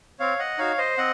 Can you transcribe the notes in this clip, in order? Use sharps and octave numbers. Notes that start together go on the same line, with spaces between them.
C4 C#5 F5
D#5 F#5
D#4 F#4 C#5 F5
C5 D#5
C4 D#5 F#5